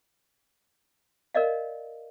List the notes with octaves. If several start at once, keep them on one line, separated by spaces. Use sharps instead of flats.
A#4 D5 D#5 F5